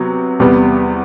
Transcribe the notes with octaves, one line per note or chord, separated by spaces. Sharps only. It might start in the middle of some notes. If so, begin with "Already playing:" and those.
Already playing: C3 F#3 B3
E2 C3 G3 B3